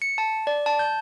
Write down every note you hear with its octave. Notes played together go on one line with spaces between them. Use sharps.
C#7
A5
D5
A5
G6